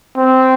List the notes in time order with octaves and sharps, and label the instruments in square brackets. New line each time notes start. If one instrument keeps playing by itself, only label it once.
[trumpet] C4